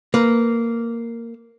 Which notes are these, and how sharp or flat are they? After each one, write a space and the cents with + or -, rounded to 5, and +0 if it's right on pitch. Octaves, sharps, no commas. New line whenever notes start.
A#3 -10 B4 +0